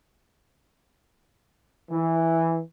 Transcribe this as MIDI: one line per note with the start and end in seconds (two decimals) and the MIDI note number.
1.91 2.61 52